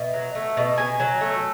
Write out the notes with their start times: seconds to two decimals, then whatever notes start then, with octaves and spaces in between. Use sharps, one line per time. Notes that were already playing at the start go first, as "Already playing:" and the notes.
Already playing: B2 E5
0.13 F#3
0.35 A3
0.57 B2
0.78 B2 G#5
1.00 F#3
1.21 A3